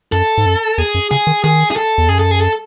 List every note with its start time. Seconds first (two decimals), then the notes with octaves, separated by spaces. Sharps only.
0.12 F#2 A4
0.38 G#2
0.46 F#2
0.78 E2 G#4
0.95 F#2
1.11 C#3 G#4
1.27 D#3
1.44 D#3 G#4
1.71 G#4
1.76 A4
1.98 E2
2.09 F#2 G#4
2.19 A4
2.31 G#4
2.41 A4